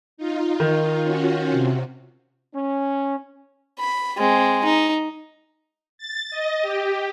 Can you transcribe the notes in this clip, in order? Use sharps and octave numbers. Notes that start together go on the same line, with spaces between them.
D#4 F4
D#3
C#4 F4 F#4
C3
C#4
B5
G#3 C4
D#4
A6
D#5
G4